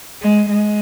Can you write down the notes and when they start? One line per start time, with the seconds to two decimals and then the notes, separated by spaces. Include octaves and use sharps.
0.22 G#3
0.50 G#3